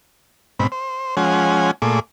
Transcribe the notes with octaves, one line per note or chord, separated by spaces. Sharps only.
G#2 B2 C4 B5
C5
F3 G#3 C#4 F#5 G#5
A#2 A3 G#4 D6